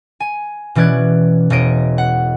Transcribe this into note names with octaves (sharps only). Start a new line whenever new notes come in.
G#5
B2 E3 C#4 D5 F#6 G#6
E1 C#5 D#5 D7
F#5